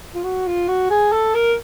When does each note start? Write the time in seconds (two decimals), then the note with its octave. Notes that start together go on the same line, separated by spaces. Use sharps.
0.14 F4
0.23 F#4
0.47 F4
0.68 F#4
0.90 G#4
1.12 A4
1.34 A#4